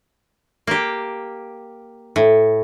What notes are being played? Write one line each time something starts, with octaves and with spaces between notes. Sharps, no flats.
A#3 G4
A2